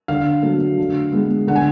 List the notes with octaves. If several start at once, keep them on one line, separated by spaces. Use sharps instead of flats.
D3 F5
F#3 A3
D3
G#3 B3
D3 F#5
G#5